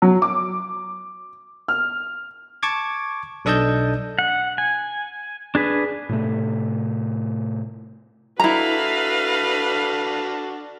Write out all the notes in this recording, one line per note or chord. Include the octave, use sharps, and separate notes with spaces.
F#3
D6
F6
A5 C#6 D6 G#6
B1 D4 A4 D#5 A5 G6
F#5
G#5
D4 G#4 B4
A2 C3 A3
D4 E4 F#4 A4 B4 F5 A#5